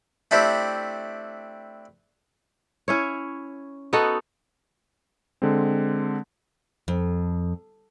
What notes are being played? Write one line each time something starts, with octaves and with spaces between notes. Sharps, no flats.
A3 C4 D4 E4 G4
C#4 E4 C#5
B3 D#4 F#4 A4
D3 G#3 C4
F2